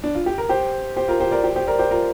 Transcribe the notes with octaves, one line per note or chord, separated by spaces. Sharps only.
D4
F4
G4
A#4
G4 C5
G4 C5
F4 A#4
G4 C5
A#4 D5
G4 C5
G4 C5
A#4 D5
G4 C5
F4 A#4